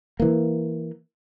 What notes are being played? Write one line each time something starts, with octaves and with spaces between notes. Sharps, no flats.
E3 A#3